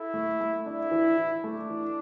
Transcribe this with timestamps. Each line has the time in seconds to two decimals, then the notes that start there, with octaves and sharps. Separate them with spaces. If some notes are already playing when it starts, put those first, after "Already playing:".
Already playing: E4 A4
0.14 A3
0.41 A3
0.66 D4 E4
0.91 E3
1.17 E3
1.44 A3 D4
1.70 E3